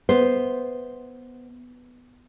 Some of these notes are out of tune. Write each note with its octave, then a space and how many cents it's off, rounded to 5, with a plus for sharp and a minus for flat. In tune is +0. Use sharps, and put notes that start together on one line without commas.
B3 +0 C5 -5 E5 +0